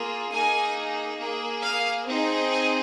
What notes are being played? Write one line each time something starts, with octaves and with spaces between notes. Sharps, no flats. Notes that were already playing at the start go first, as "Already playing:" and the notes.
Already playing: A#3 F4 G#4
A#3 D#4 G#4 G#5
A#3 G#4
F5
C4 D#4 G#4
G#5